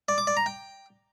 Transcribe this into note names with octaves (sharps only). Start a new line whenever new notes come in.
D5
D6
D5
A#5
G5